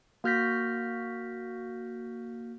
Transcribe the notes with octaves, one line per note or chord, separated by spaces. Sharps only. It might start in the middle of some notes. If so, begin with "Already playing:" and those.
A#3 F#4 F6 G6 A#6 B6